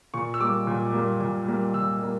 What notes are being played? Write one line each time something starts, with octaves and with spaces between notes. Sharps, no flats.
A#2 C#6
E6
G3 A#3 D6
A#2
G3 A#3
A#2
G3 A#3
A#2 E6
G3 A#3